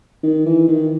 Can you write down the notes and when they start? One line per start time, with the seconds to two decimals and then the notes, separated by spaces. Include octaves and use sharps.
0.23 D#3
0.46 E3
0.68 D#3